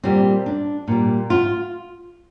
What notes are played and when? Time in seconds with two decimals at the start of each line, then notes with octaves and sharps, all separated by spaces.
0.03 A#2 G3 C4
0.46 D4
0.88 A#2 G3
1.30 F4